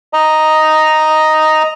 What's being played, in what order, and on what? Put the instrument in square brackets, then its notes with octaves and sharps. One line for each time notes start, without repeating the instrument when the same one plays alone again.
[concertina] D#5 A#5